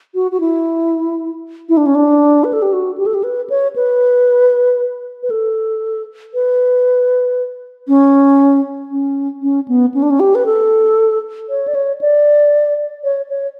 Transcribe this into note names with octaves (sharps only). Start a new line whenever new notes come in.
F#4
F#4
E4
E4
D4
C#4
D4
B4
A4
G4
F#4
G4
A4
G4
B4
C#5
B4
B4
A4
B4
C#4
C#4
C#4
B3
C#4
D4
C#4
G4
B4
A4
C#5
D5
C#5
D5
C#5
C#5